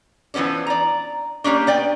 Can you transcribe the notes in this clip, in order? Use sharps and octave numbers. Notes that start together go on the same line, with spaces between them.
E3 F3 B3 C#4 D4
D5 A#5
G3 A#3 C#4 D4
B3 D5 G5